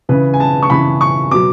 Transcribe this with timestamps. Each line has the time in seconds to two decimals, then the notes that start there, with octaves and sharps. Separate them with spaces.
0.09 C#3 E3 B4
0.34 G#5
0.40 A5
0.62 C#6
0.70 C#3 E3 B5
1.01 C#6
1.30 B2 F#3 D6